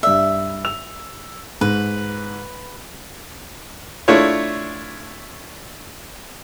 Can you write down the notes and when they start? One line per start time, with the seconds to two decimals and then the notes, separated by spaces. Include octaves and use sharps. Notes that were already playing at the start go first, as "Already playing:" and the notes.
0.03 G2 D5 E5
0.65 E6 F7
1.61 G#2 B4
4.08 A3 D4 E4 F4 C#5